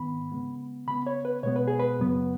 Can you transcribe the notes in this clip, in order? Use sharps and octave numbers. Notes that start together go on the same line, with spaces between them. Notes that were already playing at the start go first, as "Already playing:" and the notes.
Already playing: G#2 D#3 B3 B5
C#3 G#3 B3
C#3 B3 B5
C#5
B4
B2 G#3 B3 C#5
B4
G#4
B4
F#2 C#3 F#3 B3